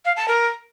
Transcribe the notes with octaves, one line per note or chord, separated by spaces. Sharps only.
F5
A5
A#4